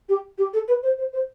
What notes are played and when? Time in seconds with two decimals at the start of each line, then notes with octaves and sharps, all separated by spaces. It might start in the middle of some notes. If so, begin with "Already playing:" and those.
0.09 G4
0.38 G4
0.53 A4
0.68 B4
0.83 C5
0.98 C5
1.13 C5